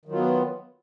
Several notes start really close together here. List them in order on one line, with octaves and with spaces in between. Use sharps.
D#3 F#3 F4 B3